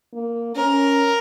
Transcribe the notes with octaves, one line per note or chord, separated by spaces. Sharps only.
A#3
C#4 A#4